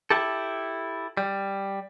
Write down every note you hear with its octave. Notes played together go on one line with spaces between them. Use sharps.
E4 G4 A4
G3